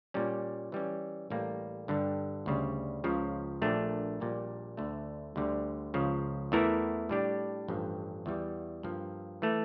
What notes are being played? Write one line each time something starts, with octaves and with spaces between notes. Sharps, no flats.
A#2 G3 C#4
E3 G3 C#4
A1 A2 G3 A#3
G2 D3 G3
D2 C#3 G3
C#2 C#3 F3
A#1 A#2 A3 D4
A#1 A#2 G3 A#3
D2 D3 A3
D2 D3 G3
C#2 C#3 F3
E2 E3 A3 E4 A#4
A2 G3 D4 G4
A1 G2 F3
E2 E3 G3
G2 F3 A#3
E3 A3